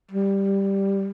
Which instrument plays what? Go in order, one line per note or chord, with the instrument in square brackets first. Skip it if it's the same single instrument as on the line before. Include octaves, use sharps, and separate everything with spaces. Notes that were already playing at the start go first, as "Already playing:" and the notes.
[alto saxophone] G3